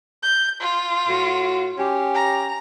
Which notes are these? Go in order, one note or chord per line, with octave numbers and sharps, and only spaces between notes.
G6
F4
A2 F#4
C#4 G4
A#5